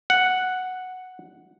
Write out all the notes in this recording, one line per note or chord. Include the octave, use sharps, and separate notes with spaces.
F#5